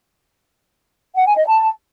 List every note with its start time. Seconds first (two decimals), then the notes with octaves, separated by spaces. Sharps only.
1.17 F#5
1.27 G#5
1.37 D#5
1.47 A5